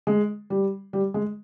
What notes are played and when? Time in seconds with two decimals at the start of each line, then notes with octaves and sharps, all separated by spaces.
0.07 G#3
0.50 G3
0.93 G3
1.14 G#3